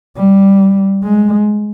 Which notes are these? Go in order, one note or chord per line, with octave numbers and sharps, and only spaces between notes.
G3
G#3